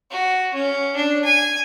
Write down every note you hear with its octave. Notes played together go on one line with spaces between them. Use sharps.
F#4
C#4
D4
G#5